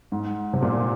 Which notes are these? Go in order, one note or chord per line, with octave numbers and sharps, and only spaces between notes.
G#2
C3
A#2